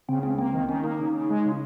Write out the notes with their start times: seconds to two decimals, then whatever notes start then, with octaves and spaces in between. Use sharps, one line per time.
0.08 C#3 C4
0.23 C#2 C4
0.38 A#3 C4
0.54 D#3
0.69 D#3 C#4
0.83 A#3 D#4
0.99 C#3
1.14 C#3
1.29 G#3
1.45 C#3